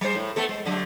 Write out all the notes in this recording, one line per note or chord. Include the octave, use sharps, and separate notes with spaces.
G3 C5
A2
A3 B3 A4
G#3
D3 F#3 A3